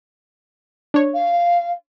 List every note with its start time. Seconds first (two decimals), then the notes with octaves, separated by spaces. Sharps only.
0.94 D4 C#5
1.13 F5